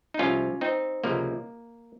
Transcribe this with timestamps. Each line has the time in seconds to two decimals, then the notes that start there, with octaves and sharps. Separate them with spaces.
0.14 D#4
0.19 C2 C3 F3 G#3 C#4 F4
0.61 C4 D#4
1.04 C#2 C3 F3 G#3 A#3